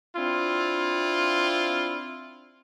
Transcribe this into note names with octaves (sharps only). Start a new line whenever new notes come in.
C4 D4 E4 F4